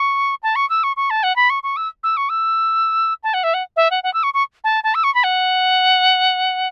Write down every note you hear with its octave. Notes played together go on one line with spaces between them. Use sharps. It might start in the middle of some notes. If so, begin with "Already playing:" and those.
Already playing: C#6
A5
C#6
E6
C#6
C#6
A5
F#5
B5
C#6
C#6
E6
E6
C#6
E6
A5
F#5
E5
F#5
E5
F#5
F#5
E6
C#6
C#6
A5
A5
E6
C#6
B5
F#5